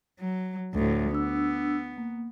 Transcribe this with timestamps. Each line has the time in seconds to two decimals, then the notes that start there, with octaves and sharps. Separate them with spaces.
0.20 F#3
0.74 D2 A2
1.11 B3 D4 E6
1.98 A#3